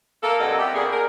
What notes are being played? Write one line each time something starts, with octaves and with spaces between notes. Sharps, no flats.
A#3 A4
F#2 B2 G3 A4 D#5 F#5
B3 C4 E4 G4
B2 A#3 D4 G#4
A#4